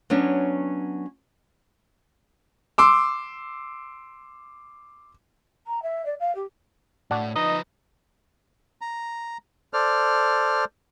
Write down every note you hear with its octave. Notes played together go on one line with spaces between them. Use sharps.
F#3 B3 C#4 D4
C6 D6 E6
A#5
E5
D5
F5
G4
A2 D4 F#4 F#5
F3 D#4 B4 D#5
A#5
A4 C5 D5 F6